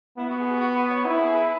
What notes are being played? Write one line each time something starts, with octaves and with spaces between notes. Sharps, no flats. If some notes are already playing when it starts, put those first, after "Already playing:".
B3 E4
F#4
G#4
F#4
F#4
B4
C#5
E4 B4
G#4
B4